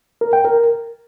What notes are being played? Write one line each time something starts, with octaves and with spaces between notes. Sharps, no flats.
A#4
G5
A#4